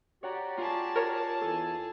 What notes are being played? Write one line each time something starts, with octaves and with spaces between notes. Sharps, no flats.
F#4 G4 C#5 D5 F#5 A#5
F4 G#4 A5
A#4 C#5
E2 E3 A4 G#5